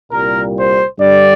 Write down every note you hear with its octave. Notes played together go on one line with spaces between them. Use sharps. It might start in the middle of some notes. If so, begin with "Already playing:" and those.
C2 A#2 G3 A#4
C5
G2 D3 G3 D5